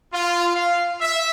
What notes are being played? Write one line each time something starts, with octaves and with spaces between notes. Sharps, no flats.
F4
F5
E5